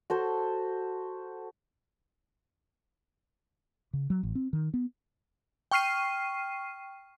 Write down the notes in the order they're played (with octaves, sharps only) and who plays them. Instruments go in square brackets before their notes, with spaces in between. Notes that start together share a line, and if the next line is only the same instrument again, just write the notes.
[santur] F#4 A4 C5
[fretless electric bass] C#3
F#3
A1
C4
D#3
B3
[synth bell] G5 C#6 F6 C7 D#7